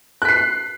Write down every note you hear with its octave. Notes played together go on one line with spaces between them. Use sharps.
F#6 B6 C7